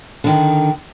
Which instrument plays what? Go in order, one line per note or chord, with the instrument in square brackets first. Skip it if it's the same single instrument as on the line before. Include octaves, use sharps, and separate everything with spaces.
[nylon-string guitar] D3 D#3